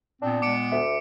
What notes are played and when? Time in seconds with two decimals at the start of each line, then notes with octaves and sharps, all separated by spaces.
0.22 A#2 B3 C4 D4
0.42 A#2 G#3 B3 D6 C#7 D7
0.72 D2 E5